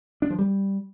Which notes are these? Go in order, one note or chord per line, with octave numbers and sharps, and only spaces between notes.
D4
F3
G3